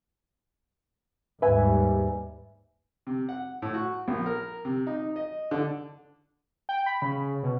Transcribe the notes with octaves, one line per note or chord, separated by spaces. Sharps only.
D#2 G#2 G3 B4 E5 G#5
C3
F#5
A2
F#4
A#1
A#4
C3
D#4
D#5
D3
G5
B5
C#3
B2